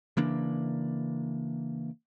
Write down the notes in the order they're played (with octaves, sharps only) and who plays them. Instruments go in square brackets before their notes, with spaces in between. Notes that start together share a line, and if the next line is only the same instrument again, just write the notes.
[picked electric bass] C#3 E3 A#3 D4